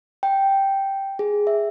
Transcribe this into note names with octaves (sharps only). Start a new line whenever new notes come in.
G5
G#4
E5